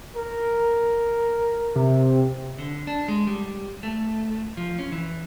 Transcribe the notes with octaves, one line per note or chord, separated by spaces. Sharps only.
A#4
C3
D3
D4
G#3
G3
A3
F3
C#4
E3